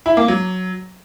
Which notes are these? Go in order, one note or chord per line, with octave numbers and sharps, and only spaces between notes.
E4
A#3
F#3